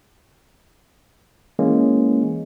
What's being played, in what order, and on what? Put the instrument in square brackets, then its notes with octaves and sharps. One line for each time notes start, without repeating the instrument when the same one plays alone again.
[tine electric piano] E3 G#3 A#3 C#4